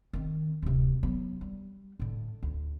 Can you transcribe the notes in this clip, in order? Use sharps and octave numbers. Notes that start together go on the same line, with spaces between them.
D#3 C4
D1 C3
F#3 B3
G3
A2 D3
D2